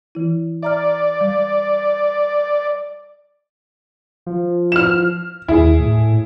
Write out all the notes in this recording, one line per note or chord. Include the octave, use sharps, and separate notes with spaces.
E3 E4
D5 E5 A#5 F6
G3
F3
F6 E7
D#2 E4 G#4
A2